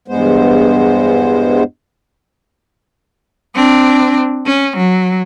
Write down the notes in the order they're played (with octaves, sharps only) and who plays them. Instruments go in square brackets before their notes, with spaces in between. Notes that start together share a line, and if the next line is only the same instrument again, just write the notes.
[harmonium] E2 G2 G#3 B3 C5
[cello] C4 D4
C#4
F#3